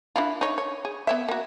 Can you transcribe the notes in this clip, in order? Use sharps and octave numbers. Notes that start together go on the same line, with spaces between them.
D4 E4 F4
D#4 C#5
C#5
G#4
B3 C#5 E5
A#3 F#4